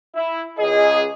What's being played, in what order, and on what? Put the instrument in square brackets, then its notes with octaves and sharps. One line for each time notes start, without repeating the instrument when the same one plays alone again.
[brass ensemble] E4
[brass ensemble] C#2 G#4 [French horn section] D#5